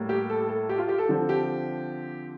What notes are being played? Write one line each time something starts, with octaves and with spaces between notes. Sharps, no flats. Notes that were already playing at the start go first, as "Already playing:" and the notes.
Already playing: A2 G3 A#3
G4
A4
A4
G4
F4
G4
A4
D3 F3 C4 A4
G4